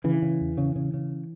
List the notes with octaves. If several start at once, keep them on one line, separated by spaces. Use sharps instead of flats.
C#3 E3
C#3
E2
C#3
C#3
C#3